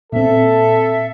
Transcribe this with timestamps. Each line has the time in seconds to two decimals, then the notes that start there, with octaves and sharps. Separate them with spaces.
0.12 A#2 C4 A4 E5